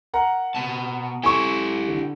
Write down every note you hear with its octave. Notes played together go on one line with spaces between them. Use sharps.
A#4 F#5 A#5
B2 A5
E4 G4 A4 G#5 C#6
D3